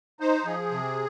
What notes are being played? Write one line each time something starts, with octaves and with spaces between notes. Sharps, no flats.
D#4 C5
F3 G#4
C3